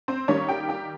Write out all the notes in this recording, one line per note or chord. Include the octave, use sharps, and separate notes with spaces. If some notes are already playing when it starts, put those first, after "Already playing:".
C4 C5
D#3 G3 A#3 C#4 C#5
G4 G5
G4 G5